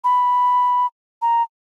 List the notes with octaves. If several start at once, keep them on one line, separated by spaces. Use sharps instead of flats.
B5
A#5